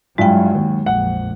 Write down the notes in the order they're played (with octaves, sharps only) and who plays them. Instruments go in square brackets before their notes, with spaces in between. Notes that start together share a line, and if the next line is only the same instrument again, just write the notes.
[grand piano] G2 E4 F4 [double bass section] F#3 [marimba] G#3 G5
[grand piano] D#2
[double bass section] A#1 F2 [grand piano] F#5